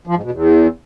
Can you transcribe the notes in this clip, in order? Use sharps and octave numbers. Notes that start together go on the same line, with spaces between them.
F3
G#2
B2
E2